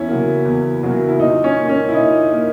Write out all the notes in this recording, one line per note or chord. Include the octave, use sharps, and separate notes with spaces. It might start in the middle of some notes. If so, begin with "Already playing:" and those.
Already playing: E2 C#4 E4
C#3 F#3 A#3
E2
C#3 F#3 A#3
E4
A#2 D#4
C#4
A#3
C#4
E4
A#2 D#4
A#3